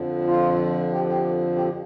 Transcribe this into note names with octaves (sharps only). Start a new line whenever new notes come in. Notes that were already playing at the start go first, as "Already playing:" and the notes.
Already playing: F2 D3 F3
F4
G4
G4
G4